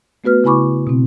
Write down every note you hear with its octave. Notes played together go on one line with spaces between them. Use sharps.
A3 B3 F#4 B4 F6
C#3 E4 G#5 B5 C#6 D6
B2 C4